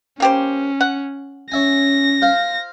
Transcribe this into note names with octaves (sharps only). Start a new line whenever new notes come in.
A#3 C#4 G4 C5
F#5
C#4 C#5 E5 G#5 A#6
F4 C5 F5